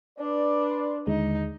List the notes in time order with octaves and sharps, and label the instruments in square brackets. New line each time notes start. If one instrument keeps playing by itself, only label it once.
[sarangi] D4 [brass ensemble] B4 D5
[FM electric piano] C6
[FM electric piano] D#2 D3 G#3 [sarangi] D#4